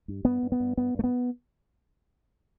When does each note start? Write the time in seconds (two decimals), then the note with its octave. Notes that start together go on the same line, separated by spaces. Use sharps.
0.08 G2
0.25 G2 B3
0.43 G2
0.52 B3
0.60 G2
0.78 G2 B3
0.95 G2 A3
1.04 B3